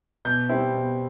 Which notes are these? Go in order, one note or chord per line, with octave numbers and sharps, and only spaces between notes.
B2 G6
G3 C4 E4
B2